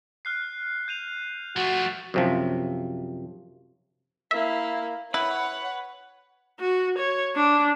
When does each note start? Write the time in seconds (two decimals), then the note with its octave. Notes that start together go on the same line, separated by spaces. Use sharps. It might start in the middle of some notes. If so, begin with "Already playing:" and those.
0.25 F6 F#6 C7
0.88 G6 D#7 F7
1.57 F3 A3 F#4
2.14 F#2 C3 F3
4.31 A#3 E4 E5
5.14 E4 B4 C#5 F#5
6.60 F#4
6.99 C#5
7.36 D4